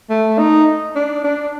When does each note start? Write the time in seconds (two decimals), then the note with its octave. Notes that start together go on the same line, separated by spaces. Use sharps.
0.10 A3
0.39 D#4
0.96 D4
1.24 D4